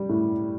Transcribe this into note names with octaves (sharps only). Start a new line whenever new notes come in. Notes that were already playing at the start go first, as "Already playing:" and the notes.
Already playing: G3
A2